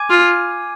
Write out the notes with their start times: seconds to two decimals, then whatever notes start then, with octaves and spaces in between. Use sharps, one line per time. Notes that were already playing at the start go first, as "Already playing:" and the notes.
Already playing: G#5 D6 G#6 D#7
0.10 F4